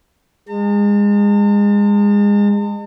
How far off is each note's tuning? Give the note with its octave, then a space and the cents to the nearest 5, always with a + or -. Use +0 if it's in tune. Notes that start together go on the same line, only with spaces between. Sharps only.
G#3 -25 A5 +45